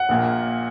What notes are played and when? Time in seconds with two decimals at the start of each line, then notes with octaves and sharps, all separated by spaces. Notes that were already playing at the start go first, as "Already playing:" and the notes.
Already playing: F#5
0.09 A#1 A#2 A#3